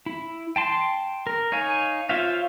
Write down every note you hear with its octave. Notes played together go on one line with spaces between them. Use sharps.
E4
G5 A5 C6
A#4
D#4 C#5 F5 G#5
F4 C5 C#5 E5 F5